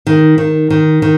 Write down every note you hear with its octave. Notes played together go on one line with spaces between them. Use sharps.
D#3
D#3
D#3
D#3